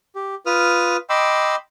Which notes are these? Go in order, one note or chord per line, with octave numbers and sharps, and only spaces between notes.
G4
F4 B4 D#6 F6
D#5 G5 B5 C6 D6 E6